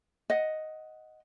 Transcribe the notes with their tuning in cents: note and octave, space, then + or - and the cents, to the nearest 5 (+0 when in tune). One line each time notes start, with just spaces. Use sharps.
D#5 +5 F#5 +0